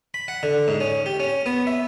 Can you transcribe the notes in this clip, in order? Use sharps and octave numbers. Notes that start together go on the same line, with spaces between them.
B5
F#5
D3
G#2
C#4
G4
C#4
B3
E5